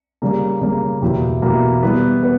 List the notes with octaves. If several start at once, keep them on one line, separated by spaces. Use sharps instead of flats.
C#3 G3 A#3
C#3 G3 A#3
E2 B2 A#3 E4 G4
E2 B2 A#3 E4 G4
E3 G3 B3
B3